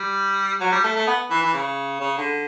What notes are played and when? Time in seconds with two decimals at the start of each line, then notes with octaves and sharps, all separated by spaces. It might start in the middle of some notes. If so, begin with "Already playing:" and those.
Already playing: G3
0.60 F#3
0.72 G3
0.83 A3
0.96 A3
1.07 B3
1.30 E3
1.42 E3
1.54 C#3
2.00 C#3
2.18 D3